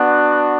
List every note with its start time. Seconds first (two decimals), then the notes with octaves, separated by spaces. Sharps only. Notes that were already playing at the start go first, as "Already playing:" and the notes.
Already playing: B3 D4 F#4